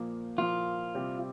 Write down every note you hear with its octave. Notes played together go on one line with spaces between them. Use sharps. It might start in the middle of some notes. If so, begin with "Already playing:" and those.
Already playing: A#2 F3 A#3
A#2 F3 A#3 F4
C3 G3 C4 G4